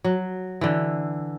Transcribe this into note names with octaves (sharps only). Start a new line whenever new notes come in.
F#3
D3 E3